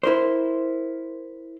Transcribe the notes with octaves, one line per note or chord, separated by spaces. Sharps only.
E4 A#4 C5